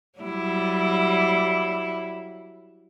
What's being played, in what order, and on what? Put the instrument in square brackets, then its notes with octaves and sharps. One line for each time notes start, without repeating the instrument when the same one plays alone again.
[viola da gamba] F#3 G3 E4